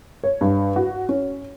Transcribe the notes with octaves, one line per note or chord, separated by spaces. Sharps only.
C#5
G2
F#4
C#4